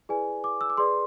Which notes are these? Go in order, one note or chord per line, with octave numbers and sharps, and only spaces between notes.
E4 G#4 B4 D5 G#5
D6
E6
D6
G#4 B4 D5 C6